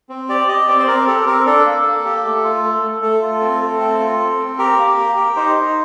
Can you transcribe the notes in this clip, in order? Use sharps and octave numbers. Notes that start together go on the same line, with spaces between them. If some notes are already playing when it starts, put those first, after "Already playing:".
C4
G4 D5
G4 D#5
C4 D5
C5
C4 A#4
G4 A4
C4 A#4
D4 A4
A#3
A#3
G4
A3
F4
A3
A3
A3 A4
F4
C4
A3
C4
F4
C4
C4
G4 A#4
A#3
G4
G4
D#4 C5
D#4